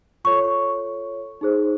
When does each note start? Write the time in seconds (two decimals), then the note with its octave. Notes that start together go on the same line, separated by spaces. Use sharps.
0.24 F4 A4 C#5 C#6
1.41 D#4 G#4 C5